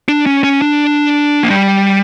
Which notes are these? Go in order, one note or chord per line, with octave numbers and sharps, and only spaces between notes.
D4
C#4
C#4
D4
A#3
G3